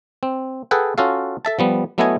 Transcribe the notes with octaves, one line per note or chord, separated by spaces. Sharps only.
C4
G#4 A4 B4 F#5 G5
C#4 F4 F#4 A4 F5
A4 E5 A5
F3 G3 B3
F#3 A3 B3 E4 D#5 G#5